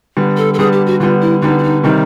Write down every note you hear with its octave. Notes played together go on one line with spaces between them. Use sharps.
D3 G3 B3
A4
A4
D3 G3 B3 G#4
G4
F#4
D3 G3 B3 F4
E4
D3 G3 B3 D#4
E4
D#4
C3 D#3 G3 D#4